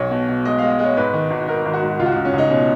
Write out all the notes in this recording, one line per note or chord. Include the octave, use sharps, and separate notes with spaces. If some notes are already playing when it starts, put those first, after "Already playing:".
Already playing: B1 C#5
B2
B2
G#3 D#5
G#3 F5
D#5
G#3
C#5
G#2 B4
D#3
G#1
G#1 A#4
G#1
F#4
G#2
C#2 F4
F#4
C#2 F4
C#4
C#2 D#4
B2 C#4